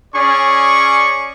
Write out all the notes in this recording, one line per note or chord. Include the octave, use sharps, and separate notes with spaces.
C#4 G#4 D5 C#6